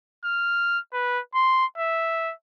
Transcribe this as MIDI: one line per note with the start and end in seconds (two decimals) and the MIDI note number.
0.25 0.79 89
0.93 1.20 71
1.35 1.65 84
1.78 2.33 76